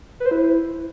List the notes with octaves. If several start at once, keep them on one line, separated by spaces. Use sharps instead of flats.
B4
C5
E4